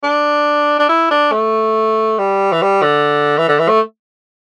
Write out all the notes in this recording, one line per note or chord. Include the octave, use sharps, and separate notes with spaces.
D4
D4
E4
D4
A3
G3
E3
G3
D3
E3
D3
E3
A3